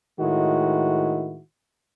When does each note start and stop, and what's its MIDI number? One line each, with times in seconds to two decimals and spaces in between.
0.20 1.41 45
0.20 1.41 51
0.20 1.41 56
0.20 1.41 64
0.20 1.41 66